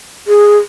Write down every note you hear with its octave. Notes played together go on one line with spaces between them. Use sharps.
G#4